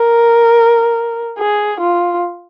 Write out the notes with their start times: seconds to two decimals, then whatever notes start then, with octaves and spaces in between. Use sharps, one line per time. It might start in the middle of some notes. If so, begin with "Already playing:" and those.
Already playing: A#4
1.39 G#4
1.80 F4